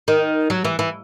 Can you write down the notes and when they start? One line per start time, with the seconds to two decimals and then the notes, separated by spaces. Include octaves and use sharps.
0.08 D#3
0.50 F#3
0.65 E3
0.79 E3